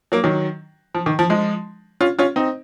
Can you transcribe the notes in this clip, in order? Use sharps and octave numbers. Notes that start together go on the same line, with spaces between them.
F#3 A#3
D#3 F#3
F3
D#3
F3
F3 G#3
C#4 F4
C#4 F4
C4 D#4